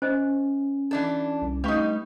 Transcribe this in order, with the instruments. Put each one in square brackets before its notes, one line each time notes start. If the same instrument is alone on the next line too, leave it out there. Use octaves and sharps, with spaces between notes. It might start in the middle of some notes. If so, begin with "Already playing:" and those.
[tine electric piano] C#4 [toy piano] C5 D#5
[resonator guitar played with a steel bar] E3 D4 A4
[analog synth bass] C2
[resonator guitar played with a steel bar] G3 D#4 [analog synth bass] A3 [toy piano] B4 F5 C#6